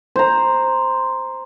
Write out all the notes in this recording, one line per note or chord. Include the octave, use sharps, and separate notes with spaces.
C5 A#5